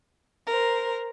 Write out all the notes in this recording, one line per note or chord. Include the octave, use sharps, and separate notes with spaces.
A#4 C5